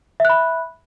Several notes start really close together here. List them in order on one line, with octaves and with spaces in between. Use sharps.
E5 F#6 B5